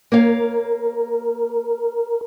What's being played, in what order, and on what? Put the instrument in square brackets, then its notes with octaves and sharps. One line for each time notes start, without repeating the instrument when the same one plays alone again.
[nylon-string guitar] A#3 C#5 F5 [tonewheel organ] A#4